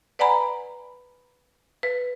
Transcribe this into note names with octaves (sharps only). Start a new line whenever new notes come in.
B4 D5 F#5 G#5 A#5 B5
B4